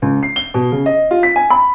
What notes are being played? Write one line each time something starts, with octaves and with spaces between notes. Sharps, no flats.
C#2
C7
G7
B2
C#3
D#5
F4
B6
G#5
B5